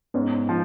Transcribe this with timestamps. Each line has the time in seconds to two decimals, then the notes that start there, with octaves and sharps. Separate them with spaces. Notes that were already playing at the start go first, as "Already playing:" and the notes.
0.14 G#2 B3 C#4
0.49 F3